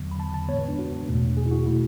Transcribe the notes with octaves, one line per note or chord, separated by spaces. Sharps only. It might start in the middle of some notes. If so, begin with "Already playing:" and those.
Already playing: E2 D3 F#3 B3
B5
A5
A5
A2 E3 G#3 B3 C#5
B4
D4
F#4
E2 B2 A3
G#4
E4
F#4
B2 A3 E4